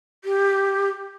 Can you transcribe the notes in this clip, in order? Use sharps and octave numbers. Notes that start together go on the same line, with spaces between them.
G4